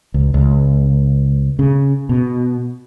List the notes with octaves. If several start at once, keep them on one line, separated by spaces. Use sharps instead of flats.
C#2
C#2
C#3
B2